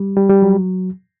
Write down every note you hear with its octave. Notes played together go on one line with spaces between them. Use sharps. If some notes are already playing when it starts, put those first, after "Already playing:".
Already playing: G3
G3
G3
F#3